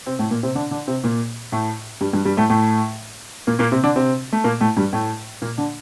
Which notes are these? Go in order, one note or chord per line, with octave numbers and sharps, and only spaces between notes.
C3 C4
A2 A3
A#2 A#3
C3 C4
D3 D4
D3 D4
C3 C4
A#2 A#3
A2 A3
G2 G3
G2 G3
G2 G3
A2 A3
A2 A3
A#2 A#3
A#2 A#3
C3 C4
D3 D4
C3 C4
A3
A#2 A#3
A2 A3
G2 G3
A2 A3
A#2 A#3
D3 D4